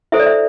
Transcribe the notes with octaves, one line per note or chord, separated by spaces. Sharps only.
E4 A4 C5 E5
D5
E5